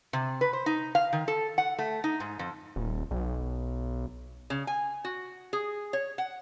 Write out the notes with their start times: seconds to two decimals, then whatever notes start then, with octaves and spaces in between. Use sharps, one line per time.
0.13 C3
0.41 B4
0.53 C5
0.66 D#4
0.95 F5
1.13 D#3
1.28 A4
1.58 F#5
1.79 A3
2.04 D#4
2.20 G#2
2.39 F2
2.76 D#1
3.11 B1
4.50 C#3
4.67 G#5
5.05 F#4
5.53 G#4
5.93 C#5
6.18 F#5